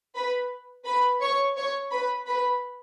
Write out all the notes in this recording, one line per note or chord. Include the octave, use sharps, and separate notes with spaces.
B4 B5
B4 B5
C#5 C#6
C#5 C#6
B4 B5
B4 B5